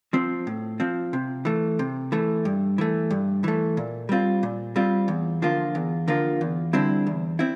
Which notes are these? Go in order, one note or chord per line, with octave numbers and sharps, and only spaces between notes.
F3 C4
A2
F3 C4
C3
E3 A3
C3
E3 A3
G2
E3 A3
G2
E3 A3
A#2
G3 C4 F4
A#2
G3 C4 F4
E2
D3 F3 A#3 F4
E2
D3 F3 A#3 F4
E2
D3 G3 C4 E4
E2
C4 E4